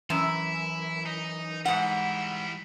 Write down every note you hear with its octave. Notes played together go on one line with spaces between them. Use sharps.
F#2 E3 E4
D#4
G#2 G3 E4 F#5